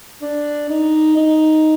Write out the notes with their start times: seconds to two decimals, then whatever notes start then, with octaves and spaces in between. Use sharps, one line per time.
0.22 D4
0.69 D#4
1.17 D#4